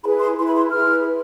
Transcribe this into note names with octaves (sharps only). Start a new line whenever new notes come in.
E4 G#4 B4 B5
C6
E4 G#4 B4 C6
B5
C6
E4 G#4 B4 F6
B4